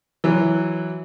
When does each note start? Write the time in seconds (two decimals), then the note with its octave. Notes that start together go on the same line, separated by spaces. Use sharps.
0.24 E3 F#3